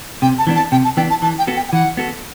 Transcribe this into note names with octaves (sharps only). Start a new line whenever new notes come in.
C3 G5
A5
E3 B3 D4
A5
C3 G5
A5
E3 B3 D4 G5
A5
E3 A5
G5
B3 F#4 A4
G5
G5
E3 F#5
B3 F#4 A4